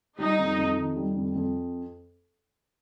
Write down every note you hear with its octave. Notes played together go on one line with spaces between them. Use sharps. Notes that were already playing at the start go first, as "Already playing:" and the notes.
G3 D#4
F2
F2
D#3
G3
F2
F2